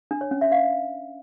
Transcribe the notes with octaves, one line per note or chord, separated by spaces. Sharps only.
D4
C#5
C#4
E5
F5